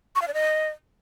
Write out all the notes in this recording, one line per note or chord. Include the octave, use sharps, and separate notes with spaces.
C#6
F5
D5
D#5